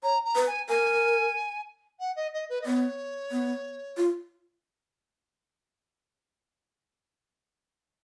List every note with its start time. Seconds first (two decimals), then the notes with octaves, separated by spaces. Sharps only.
0.03 C#5 A#5
0.25 A#5
0.35 B4
0.47 G#5
0.69 A#4 G#5
2.00 F#5
2.16 D#5
2.33 D#5
2.49 B4
2.62 D#5
2.66 B3 C#5
3.31 B3
3.97 F4